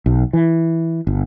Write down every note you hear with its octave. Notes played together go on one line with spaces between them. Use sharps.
B1
E3
G1